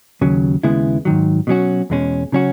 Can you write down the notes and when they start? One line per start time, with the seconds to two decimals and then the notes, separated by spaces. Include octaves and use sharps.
0.21 D#2 C#3 F#3
0.63 D#2 C#3 G#3 B3 E4
1.05 G#2 D#3 F#3
1.47 B2 F#3 C#4 F#4
1.90 E2 B2 G#3 C#4
2.32 C#3 F#3 C#4 F#4